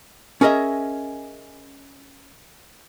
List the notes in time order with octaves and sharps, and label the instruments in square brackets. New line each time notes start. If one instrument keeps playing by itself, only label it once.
[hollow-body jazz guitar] C#4 G#4 A#4 D#5 E5